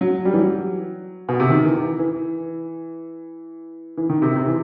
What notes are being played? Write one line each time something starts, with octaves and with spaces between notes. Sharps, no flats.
F#3
G3
E3
F#3
B2
C3
D#3
E3
E3
E3
E3
D#3
C3
C3
E3